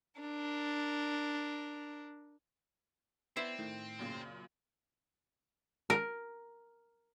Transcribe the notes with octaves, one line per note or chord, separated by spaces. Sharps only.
D4 A#4
B3 C4 E4 C5 D5 C7
A2 D#3
F#2 A#2 C#3
A#4